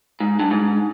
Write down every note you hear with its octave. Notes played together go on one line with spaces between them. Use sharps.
G#2
G2
G#2